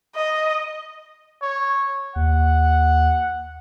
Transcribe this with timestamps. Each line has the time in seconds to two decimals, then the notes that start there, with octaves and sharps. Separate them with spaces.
0.16 D#5
1.42 C#5
2.16 D#2 F#5